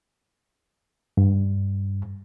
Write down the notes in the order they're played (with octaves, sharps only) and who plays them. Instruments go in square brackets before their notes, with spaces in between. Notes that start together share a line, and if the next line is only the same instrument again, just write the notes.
[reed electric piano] G2